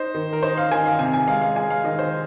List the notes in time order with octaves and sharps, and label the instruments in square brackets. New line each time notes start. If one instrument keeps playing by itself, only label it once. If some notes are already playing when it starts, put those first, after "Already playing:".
Already playing: [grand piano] D#4 C5
D#3
A#4
D#4 C5
F5
D#3 G#5
F5
C3 G#5
G#5
G#3 F5
F5
G#3 G#5
F5
D#3 D#5
C5